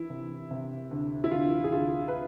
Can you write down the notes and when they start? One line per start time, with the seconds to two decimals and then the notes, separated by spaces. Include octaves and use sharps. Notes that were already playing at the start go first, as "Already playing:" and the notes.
Already playing: E3 E4
0.10 C3
0.51 C3
0.91 D2
1.24 E4
1.31 D2 F4
1.64 G#4
1.72 D2 F4
2.08 B4